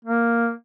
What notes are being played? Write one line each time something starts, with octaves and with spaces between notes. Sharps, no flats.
A#3